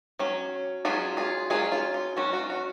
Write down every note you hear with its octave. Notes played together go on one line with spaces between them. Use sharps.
F#3 C#4
F#3 C#4 F4 G#4
F4 G#4
F#3 C#4 F4 G#4
F4
F4
F#3 C#4 F#4
F#4
F4
F#4